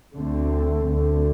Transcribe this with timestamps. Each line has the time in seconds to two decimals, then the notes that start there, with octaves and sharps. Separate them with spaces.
0.17 D2 D3 A3 C4
0.89 D2 D3 A3 C4